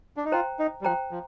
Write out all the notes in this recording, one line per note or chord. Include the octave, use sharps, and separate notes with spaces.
D4
D#4
F4 C5 G5 A#5
D#4
G3
F3 C5 G5 A#5
F3